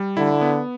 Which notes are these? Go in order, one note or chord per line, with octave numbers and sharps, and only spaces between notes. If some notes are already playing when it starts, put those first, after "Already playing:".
Already playing: G3
D3 E4
B3